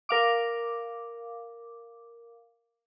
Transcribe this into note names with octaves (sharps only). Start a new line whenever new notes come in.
A#4 F5 D6